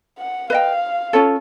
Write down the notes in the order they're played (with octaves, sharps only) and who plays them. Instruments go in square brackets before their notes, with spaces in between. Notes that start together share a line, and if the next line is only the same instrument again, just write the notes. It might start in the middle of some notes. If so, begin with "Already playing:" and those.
[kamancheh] F#5
[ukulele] B4 D#5 G5 [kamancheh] F5
[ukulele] C#4 F4 A4 C#5